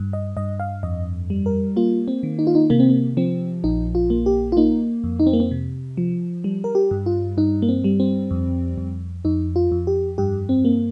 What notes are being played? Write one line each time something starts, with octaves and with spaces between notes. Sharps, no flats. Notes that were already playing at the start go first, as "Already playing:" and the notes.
Already playing: G2
D#5
G2 D#5
F5
F2 D#5
G3
A#4
A#3 F4
C4
D#3
D#4
F4
D#4
C3 A#3
C4
A#3
F3 C4
A#1 D#4
F4
A#3
G4
F4
A#3 D#4
F2
D#4
C4
A#3
C4
C3
F3
G3
A#4
G4
G2
F4
G2 D#4
A#3
C4
G3
C4
F2
F2
F2 D#4
F4
F2
G4
G2 G4
C4
A#3